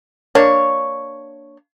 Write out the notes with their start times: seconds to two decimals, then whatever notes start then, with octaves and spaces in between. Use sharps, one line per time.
0.35 A#3 D4 C#5